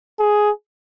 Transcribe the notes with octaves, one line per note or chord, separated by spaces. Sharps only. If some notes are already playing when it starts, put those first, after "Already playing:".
G#4